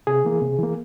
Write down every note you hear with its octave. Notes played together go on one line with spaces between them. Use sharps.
C3 G#4
E3 A#3
C3
E3 A#3